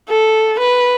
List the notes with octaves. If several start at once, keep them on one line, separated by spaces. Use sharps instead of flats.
A4
B4